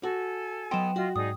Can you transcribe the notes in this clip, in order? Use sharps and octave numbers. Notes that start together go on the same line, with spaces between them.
F#4 A4 G#5
F#3 B3 D#5 G5 C6 E7
F4 F#4 D#5
G#2 D#4 G#4 D5 D#6